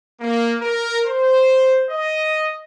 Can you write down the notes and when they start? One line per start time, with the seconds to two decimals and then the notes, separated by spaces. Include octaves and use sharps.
0.21 A#3
0.62 A#4
1.05 C5
1.90 D#5